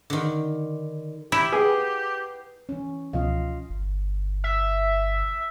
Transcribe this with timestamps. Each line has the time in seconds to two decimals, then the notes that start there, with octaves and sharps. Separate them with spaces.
0.10 D3 D#3
1.32 E4 G4
1.53 G#4 B4 F#5 G5
2.69 E3 C#4
3.13 C#2 B2 F3 F4 D#5 F5
3.70 G1
4.44 E5